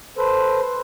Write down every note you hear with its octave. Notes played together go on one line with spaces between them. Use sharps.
A4 B4 C5